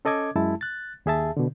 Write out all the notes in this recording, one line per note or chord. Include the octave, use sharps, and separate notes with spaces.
C#4 A4 D#5 D6 G#6
F#2 G#3 E4 A5
F#6 A6
D#2 G#4 E5 A5
B2 D3